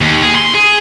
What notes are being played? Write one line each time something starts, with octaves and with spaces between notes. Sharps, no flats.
D#2
G#4
C6
G#4